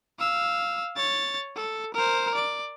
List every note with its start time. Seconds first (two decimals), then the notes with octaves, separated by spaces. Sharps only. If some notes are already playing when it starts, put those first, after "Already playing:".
0.19 F5 E6
0.96 C#5 A6
1.56 A4
1.94 A#4 C5
2.34 D5